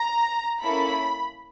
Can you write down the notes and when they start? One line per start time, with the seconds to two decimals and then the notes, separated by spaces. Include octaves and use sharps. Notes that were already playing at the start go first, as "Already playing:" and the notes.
Already playing: A#5
0.62 A#3 C#4 E4 A4 B5